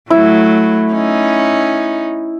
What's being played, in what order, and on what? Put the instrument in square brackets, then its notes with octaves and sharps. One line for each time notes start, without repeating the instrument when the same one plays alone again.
[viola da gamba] F#3 A3 [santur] E4
[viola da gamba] C#4 D#4